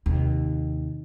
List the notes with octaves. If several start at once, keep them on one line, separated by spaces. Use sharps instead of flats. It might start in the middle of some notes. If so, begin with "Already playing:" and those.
D#2 C3